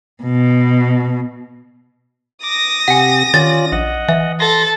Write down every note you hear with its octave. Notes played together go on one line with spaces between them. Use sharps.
B2
D6 D#6 A#6
C3 G4 F#5 G#5
D#3 C#4 F4 D5 A6
A#1 D#5 F#5
E3 E5
A4 C6 A6 A#6